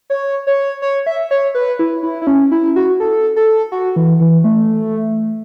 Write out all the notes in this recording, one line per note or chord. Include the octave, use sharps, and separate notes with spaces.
C#5
C#5
C#5
E5
C#5
B4
E4
E4
E4
C#4
E4
F#4
A4
A4
F#4
E3
E3
A3